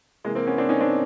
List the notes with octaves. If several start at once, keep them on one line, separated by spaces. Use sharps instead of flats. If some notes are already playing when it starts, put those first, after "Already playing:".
C3 E3 G#3 A#3
A#3 C4
B3 C#4
C4 D4
C#4 D#4
C4 D4